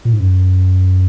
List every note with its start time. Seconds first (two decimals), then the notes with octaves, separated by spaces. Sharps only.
0.05 A#2
0.13 G#2
0.20 F#2